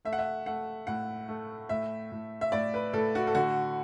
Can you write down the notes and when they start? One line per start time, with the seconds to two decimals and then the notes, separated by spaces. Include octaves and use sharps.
0.05 A3 E5
0.13 F#5
0.19 E5
0.46 A3 F#5
0.87 A2 F#5
1.28 A3
1.69 A2 E5
2.12 A2
2.41 E5
2.52 A2 D5
2.74 B4
2.93 A2 A4
3.15 F#4
3.27 A4
3.35 D3 F#4